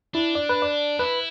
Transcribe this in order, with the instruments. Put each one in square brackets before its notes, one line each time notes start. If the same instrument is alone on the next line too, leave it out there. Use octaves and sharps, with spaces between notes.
[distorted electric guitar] D4 [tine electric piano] E4
[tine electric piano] D5
B4
D5
[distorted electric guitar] E4 [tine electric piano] B4